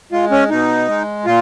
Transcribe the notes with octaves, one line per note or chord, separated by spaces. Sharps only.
G#3 F4
C#4
B2 D#4
G#3
A#2 F4